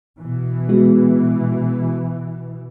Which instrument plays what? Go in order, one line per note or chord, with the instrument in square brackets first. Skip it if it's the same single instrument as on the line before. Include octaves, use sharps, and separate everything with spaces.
[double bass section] B2 E3
[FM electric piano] G#3 B3 F#4